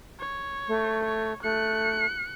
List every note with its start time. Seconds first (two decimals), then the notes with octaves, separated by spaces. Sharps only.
0.19 C#5
0.68 A3
1.04 C#5
1.43 A3 F#6 C#7